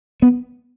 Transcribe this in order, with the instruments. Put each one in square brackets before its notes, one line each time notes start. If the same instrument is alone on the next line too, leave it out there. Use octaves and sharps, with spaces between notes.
[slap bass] B3